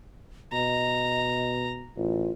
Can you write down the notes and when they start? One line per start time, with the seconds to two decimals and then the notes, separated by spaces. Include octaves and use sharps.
0.53 B2 D#5 A#5
1.97 A1 F4